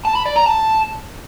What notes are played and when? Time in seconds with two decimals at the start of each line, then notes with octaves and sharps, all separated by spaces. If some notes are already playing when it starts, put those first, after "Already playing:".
0.05 A5
0.15 B5
0.26 D5
0.36 A#5
0.46 A5